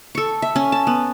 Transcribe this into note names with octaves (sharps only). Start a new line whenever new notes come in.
A4 C#6
E5
C#4
A5
B3